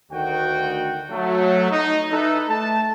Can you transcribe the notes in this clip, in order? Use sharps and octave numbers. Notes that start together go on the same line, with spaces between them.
D2 D#3 F#4 G5
F#3 A3
D#4
D#4 E4 A4 B4
A3 A5